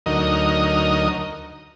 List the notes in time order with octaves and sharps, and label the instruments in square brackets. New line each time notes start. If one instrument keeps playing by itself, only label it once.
[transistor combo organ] D2 F#3 D#4 A#4 D#5